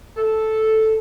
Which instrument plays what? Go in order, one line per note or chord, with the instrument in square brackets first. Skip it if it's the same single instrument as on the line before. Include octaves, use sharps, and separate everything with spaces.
[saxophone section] A4